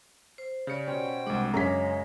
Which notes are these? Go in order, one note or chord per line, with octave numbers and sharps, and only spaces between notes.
C5
C#3 G4 D5 C#7
B2 C#4 C5 G5
C2 G#3 D4 D6
F#2 C#3 G#3 C#4 A#5 B6